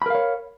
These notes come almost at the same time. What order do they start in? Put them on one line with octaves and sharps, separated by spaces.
B5 A#4 F5 C#5